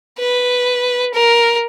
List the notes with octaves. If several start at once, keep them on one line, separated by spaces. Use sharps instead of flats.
B4
A#4